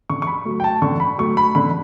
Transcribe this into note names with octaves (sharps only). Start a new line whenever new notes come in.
D3 C#6
C#6
B5
F#3 A3
G5
A5
D3 C#6
B5
F#3 A3 C#6
B5
D3 B5